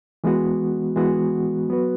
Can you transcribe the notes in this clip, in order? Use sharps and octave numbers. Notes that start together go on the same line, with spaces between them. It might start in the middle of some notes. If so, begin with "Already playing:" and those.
E3 G#3 B3 F#4
E3 G#3 B3 F#4
F#3 B3 F#4 B4